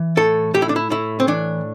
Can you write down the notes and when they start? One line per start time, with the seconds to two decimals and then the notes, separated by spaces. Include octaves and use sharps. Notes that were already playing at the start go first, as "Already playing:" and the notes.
Already playing: E3
0.17 A2 A4
0.54 A2 G4
0.62 E4
0.69 D4
0.76 E4
0.90 A2 E4
1.20 C4
1.28 E3 D4